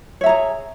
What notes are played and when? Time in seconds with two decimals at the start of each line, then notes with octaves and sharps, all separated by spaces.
0.21 C#5
0.24 E5
0.26 A#5
0.29 G#4